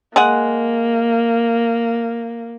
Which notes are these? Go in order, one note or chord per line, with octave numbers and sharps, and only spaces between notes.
G#3 A#3 G#4 F#5